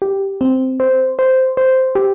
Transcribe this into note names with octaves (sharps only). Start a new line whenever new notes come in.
G4
C4
C5
C5
C5
G4